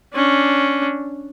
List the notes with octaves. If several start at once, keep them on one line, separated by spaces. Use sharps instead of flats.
C#4 D4